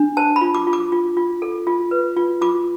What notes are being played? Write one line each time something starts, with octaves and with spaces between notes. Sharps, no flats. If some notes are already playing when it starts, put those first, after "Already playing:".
Already playing: D4
C5 A5
B5
F4
D6
F4
D6
F4
F4
A4
F4
B4
F4
F4 D6